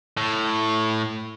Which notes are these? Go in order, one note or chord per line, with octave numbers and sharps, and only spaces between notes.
A2